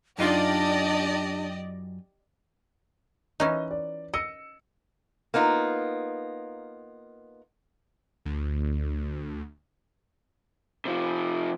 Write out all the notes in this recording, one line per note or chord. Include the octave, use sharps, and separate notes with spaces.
F#2 D4 D#4 F4 G4 D5 D#5
E3 C#4 D#4 D#5
D5
D#5 E6 C#7
A#3 B3 D#4 F4
D2
C3 F3